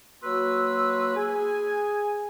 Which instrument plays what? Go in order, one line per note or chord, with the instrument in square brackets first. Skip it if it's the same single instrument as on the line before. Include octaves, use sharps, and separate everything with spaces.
[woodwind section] F#3 A#3 F#4 B4 C6 E6
G#4 G#5